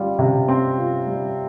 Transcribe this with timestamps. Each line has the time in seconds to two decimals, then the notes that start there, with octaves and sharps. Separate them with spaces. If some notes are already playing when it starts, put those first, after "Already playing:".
Already playing: G3 F4
0.19 C3
0.48 C4
0.78 F4
1.07 G3